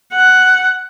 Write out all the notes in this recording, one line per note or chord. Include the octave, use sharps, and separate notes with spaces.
F#5